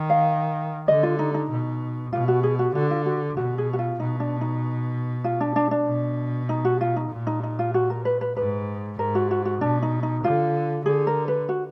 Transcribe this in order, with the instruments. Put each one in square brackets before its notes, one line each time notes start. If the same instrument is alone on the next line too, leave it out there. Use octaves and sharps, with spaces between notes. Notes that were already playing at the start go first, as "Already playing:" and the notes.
Already playing: [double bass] D#3
[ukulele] F5
[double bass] D3 [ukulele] D#5
[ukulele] F4
D#4
D#4
[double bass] B2
[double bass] B2 [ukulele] F4
[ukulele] F#4
G#4
F#4
[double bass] D3 [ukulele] F#4
[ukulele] F4
F#4
[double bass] B2 [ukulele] F#4
[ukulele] G#4
F#4
F4
[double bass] B2 [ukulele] D#4
[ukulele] D4
D#4
F4
D4
D4
D4
[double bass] B2
[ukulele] D#4
F#4
F4
D#4
[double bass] A#2
[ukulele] D#4
D#4
F4
F#4
A#4
B4
B4
[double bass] G#2 [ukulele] B4
[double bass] G#2 [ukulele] A#4
[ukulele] F#4
F#4
F#4
[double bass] B2 [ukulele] D4
[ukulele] D#4
D#4
[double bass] D3 [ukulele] F4
[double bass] D3 [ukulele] G#4
[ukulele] A#4
B4
F#4